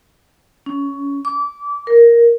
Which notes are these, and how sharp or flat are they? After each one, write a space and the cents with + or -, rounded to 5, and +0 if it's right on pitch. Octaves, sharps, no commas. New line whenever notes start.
C#4 +15
D6 -25
A#4 +5